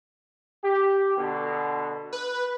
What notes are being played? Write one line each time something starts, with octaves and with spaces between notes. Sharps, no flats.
G4
B2 D3
B4